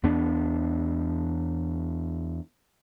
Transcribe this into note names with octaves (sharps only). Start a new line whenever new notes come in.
E2 B3 D4